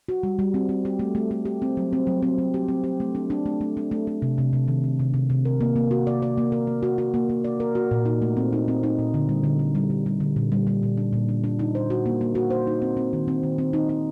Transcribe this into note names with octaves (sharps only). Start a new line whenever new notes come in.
F#4
G3
G3
C4
C4
G4
A3
A3
A3
G4
C4
F#3
C4
F#3
C4
F#3
G4
C4
G4
A3
D4
D4
A3
A3
D4
A3
A3
C3
C3
C3
D#3
D#3
C3
C3
C3
A#4
A#3
A#3
F#4
D5
D5
A#3
A#4
A#3
F#4
F#4
A#3
A#3
D5
A#4
F#4
A#2
D#4
A3
C4
D#4
C4
D#4
A#2
D3
G3
D3
D3
G3
D3
G3
D3
A#2
G3
G3
A#2
D4
A#2
D4
D4
D#4
C5
F#4
A#3
A#3
F#4
C5
D#4
C4
C4
D#3
C4
D#3
C4
D#4
D#4